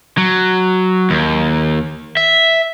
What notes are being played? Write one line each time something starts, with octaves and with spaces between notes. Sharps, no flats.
F#3
D#2
E5